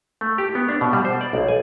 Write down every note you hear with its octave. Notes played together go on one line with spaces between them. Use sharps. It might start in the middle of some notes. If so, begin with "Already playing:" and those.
A3
G4
B3
D4
B2
G3
C5
D5
B1
G#5